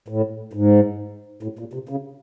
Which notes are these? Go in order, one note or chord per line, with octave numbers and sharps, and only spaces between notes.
A2
G#2
A2
A#2
C3
C#3